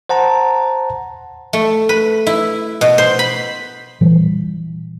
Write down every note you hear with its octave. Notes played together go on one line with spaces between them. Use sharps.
C5 F#5 A5 A#5
A3
B4
E4
B2
C5
B5
A#2 E3 G3